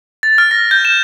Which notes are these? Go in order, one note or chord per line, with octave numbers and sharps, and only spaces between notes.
A6
F6
A#6
G6
E7